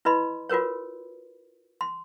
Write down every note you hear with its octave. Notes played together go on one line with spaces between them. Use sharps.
E4 B4 D#5 B5 C6
F4 F#4 A#4 B4 C#5
C6